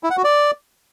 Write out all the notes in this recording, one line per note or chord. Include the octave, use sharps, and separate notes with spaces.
E4
F#5
F#4
D5